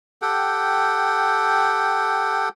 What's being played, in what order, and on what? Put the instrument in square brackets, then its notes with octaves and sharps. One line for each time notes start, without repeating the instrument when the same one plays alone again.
[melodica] G4 A4 F#5 G5